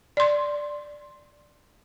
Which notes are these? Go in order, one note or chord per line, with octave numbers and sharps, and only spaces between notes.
D5 C6